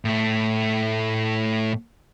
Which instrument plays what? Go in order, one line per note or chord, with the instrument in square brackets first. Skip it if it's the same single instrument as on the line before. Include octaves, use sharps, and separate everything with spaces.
[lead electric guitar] A2 A3